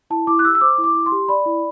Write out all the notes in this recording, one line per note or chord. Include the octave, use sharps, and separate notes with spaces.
E4 A5
E4 D6
F#6
G4 E6
E6
C5 D6
E4
D6
E4
C6
G4
D5 B5
E4